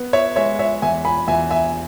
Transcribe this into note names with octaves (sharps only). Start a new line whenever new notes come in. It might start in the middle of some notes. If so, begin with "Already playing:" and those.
Already playing: B3
C#5 E5
G#3 C#5 E5
C#5 E5
E2 E5 G#5
G#5 B5
E2 E5 G#5
E5 G#5